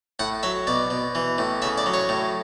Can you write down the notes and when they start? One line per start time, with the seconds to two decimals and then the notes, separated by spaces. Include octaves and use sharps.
0.19 A2 F#5
0.43 F#3 E5
0.67 B2 D5
0.90 B2
1.15 E3
1.38 A2
1.62 C#3 E5
1.78 D5
1.86 F#3
1.94 C#5
2.09 A2